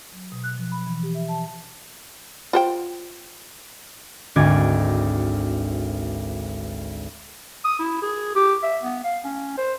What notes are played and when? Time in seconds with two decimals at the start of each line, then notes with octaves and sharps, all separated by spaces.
0.13 F#3
0.32 B2
0.44 F#6
0.58 F3
0.72 B5
0.87 E3
1.03 G4
1.14 E5
1.29 A5
2.53 F4 C5 G5
4.36 G#1 D2 D6 G#6 A6
7.64 D#6
7.79 E4
8.02 G#4
8.36 G4
8.63 E5
8.83 B3
9.04 F5
9.24 C#4
9.57 C5